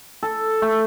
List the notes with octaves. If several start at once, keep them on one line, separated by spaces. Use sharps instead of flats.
A4
A3